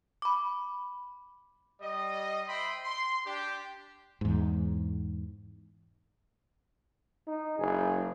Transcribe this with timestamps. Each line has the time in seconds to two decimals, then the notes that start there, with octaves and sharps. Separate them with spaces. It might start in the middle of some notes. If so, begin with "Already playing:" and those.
0.22 B5 D6
1.80 G3 D#5
2.47 C5 D#5 E5 G5 B5 C6
2.83 C6
3.25 D4 G4
4.21 E2 G#2
7.28 D#4
7.59 F#1 G#4